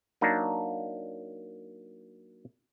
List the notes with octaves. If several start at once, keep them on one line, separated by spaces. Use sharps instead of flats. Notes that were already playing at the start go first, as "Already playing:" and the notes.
F#3 A#3 D4 D#4